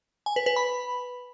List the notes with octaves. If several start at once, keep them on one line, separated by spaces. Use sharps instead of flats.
G#5
B4
B4
B5